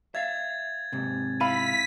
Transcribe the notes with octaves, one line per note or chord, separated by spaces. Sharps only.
E5 F5 G#6 A6
G#2 C3
E4 F5 B5 B6 D#7